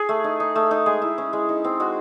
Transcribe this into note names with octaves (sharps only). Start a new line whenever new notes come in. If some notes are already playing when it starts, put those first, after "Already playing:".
Already playing: G#4
A3
D#4
D#4
A3
D#4
G#3 G#4
E4
C#4
G#3
D#4
C4
G#3 F#4